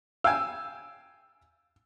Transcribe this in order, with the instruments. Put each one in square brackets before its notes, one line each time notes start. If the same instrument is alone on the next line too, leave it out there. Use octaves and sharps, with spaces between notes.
[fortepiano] F5 G5 G#5 [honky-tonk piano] E6